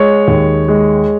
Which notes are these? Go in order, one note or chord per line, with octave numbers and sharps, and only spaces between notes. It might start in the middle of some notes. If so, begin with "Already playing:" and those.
Already playing: G#3 C#5
D#2
G#3